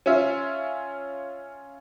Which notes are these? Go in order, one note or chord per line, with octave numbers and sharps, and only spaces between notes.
C#4 F4 E5